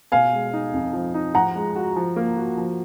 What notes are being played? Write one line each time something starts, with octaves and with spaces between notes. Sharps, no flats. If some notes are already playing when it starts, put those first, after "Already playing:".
B2 F5 G#5
G#3
D#4
F2
F3
D#4
F3 F#5 A#5
G#3
F#4
F3
A#3
F#4
F3